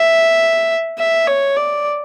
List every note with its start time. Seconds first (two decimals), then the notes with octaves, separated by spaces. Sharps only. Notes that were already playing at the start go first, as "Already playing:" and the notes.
Already playing: E5
0.99 E5
1.28 C#5
1.57 D5